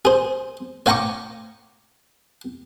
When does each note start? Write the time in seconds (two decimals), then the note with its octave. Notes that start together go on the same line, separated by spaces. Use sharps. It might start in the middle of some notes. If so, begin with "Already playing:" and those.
0.05 G#4 C5
0.86 C#5 F5 G5 A#5 C#6 D6